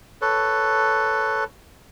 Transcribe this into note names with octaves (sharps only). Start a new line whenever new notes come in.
A4 B4 C#5